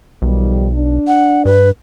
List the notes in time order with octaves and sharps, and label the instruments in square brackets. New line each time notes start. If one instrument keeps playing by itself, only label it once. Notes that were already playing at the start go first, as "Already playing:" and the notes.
[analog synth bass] B1 [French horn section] D#3 F3 G3
[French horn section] D4
[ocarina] F#5
[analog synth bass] G2 [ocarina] B4